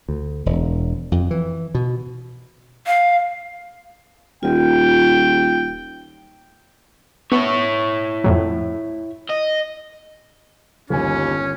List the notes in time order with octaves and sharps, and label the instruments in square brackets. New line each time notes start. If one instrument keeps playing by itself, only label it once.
[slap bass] D2
E1
F2
E3
B2
[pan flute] F5
[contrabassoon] D#1 [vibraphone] F4 [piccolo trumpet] G5
[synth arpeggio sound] B3 [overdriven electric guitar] E4 C#5
[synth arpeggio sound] F2 A2 F#3
[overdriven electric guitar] D#5
[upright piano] G1 G#5 [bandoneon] D#2 [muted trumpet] C#4